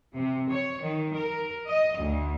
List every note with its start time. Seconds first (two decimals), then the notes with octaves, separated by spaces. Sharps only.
0.14 C3
0.52 C#5
0.83 D#3
1.17 A#4
1.67 D#5
1.98 D2